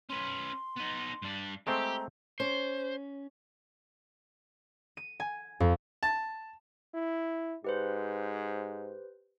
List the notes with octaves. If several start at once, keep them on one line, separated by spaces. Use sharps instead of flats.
C#4 B4 C6
B3 D#4
G2 D4
G#3 A3 C4 G4 A#5
C#4 C5
D#7
G#5
F2
A5
E4
G#2 G4 B4 C5